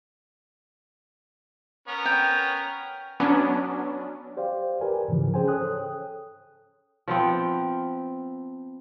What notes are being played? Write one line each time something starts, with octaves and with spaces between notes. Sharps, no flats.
B3 C#4 A#4
G5
F#3 B3 C#4 D4
G4 C5 D5 F5 G5
G4 A#4 B4 G#5
G#2 C#3 E3 F3
C#4 G#4 C5 G5 G#5
A4 C#5 G5 D#6 F#6
F3 B3 C4